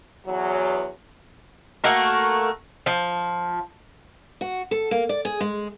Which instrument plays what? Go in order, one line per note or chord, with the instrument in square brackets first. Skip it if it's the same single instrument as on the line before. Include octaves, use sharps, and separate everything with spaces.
[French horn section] E2 F#3
[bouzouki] A3 A#3 F#4 A#4
F3
[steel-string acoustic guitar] F#4
A4
A#3
D5
G#4
G#3